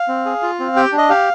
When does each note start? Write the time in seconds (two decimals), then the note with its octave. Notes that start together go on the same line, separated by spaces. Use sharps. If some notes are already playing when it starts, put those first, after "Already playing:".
Already playing: F5
0.08 C4
0.26 G#4
0.42 F4
0.60 C4
0.76 G4 G5
0.92 D4
0.98 D#5
1.10 G4 F5